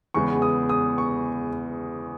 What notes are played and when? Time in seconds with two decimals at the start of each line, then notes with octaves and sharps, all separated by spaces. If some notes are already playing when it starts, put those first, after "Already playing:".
0.14 E2 C#3 G#3 B3 C#6
0.42 D#6
0.69 D#6
0.98 C#6